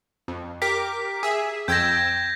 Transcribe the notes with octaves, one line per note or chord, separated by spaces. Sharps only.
F2
G4 A#4 D6 B6
G#4 E5
F2 G5 E6 G6 G#6 A#6